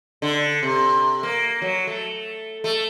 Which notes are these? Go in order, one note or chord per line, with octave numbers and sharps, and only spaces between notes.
D3
C3
A#3
F#3
A3
A3